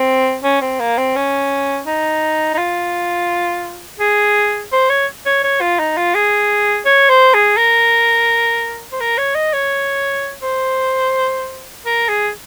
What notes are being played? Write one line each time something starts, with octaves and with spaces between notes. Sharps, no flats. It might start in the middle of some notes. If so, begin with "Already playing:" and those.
Already playing: C4
C#4
C4
A#3
C4
C#4
D#4
D#4
F4
G#4
C5
C#5
C#5
C#5
F4
D#4
F4
G#4
C#5
C5
G#4
A#4
C5
A#4
C#5
D#5
C#5
C5
A#4
G#4